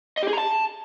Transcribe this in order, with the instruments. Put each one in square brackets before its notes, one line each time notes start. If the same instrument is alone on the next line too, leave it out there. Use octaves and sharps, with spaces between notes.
[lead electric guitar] D#5
G4
G#4
A#5
A5